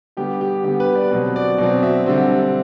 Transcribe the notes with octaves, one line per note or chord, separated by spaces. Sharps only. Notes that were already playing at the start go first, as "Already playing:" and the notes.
D3 G3 B3 G4
G4
D3 G3 B3 G4
B4
D5
B2 F#3 C4
D5
B2 F#3 C4
E5
D3 G3 C4